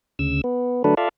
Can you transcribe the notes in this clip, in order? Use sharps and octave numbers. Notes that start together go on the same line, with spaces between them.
D2 C#3 E6
B3
D3 F#3 A3 D4 A4 B4
F4 A4 D5 E5 F5